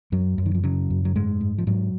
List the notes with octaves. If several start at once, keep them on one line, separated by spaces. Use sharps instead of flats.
F#2 F#3
F#2
D#3
F3
C#3 F#3
F#2
F#3
G#2 G#3
G#2
F3
G#2 F#3